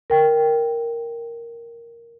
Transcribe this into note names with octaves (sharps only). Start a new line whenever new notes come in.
A#4 G5